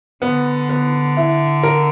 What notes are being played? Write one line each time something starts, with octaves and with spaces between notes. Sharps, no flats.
D3 B3
B3
E4
A#4